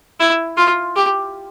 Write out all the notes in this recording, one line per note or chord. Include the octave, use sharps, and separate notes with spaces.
E4
F4
G4